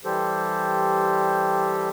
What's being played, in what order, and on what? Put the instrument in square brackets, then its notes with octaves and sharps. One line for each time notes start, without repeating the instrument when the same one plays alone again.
[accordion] E3 G3 G4 A4 C5